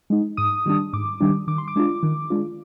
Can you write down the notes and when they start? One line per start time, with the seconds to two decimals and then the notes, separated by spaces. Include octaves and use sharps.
0.10 G#3 D#4
0.37 G#2 D#6
0.66 D#3 G3 D4
0.93 G#2 D6
1.21 D#3 G3 D4
1.47 D#3 D6
1.58 C6
1.68 D6
1.76 G#3 D4 F4
2.03 D#3
2.30 G#3 D4 F4